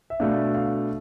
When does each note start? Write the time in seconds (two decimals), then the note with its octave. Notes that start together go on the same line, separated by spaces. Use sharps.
0.10 E5
0.20 B2 A3 D4 F5
0.55 F5